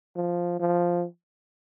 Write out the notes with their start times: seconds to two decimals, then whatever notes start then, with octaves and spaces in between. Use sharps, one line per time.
0.16 F3
0.60 F3